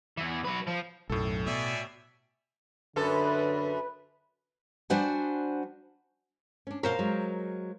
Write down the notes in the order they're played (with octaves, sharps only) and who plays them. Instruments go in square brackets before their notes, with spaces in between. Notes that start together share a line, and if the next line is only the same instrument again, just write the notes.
[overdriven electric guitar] E2 E3
F#3 B4
F3
[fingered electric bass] B1 F#2 [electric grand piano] A2 A4
[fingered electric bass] B2 [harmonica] D5 E5 G#5
[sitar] F#2 A4 [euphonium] D3 [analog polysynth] B4
[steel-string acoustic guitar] G3 D4 F#4 C5 F#5 G#5
[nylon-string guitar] C#4 D4
[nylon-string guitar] B2 C#4 C#5 [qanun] A#4 C5 F5
[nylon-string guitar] F#3 G#3